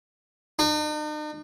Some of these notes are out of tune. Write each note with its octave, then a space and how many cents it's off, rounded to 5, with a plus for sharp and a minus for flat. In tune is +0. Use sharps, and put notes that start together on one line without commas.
D#4 -45